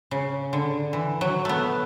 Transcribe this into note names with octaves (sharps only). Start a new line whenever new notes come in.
C#3
D3
E3
F#3
A3 B3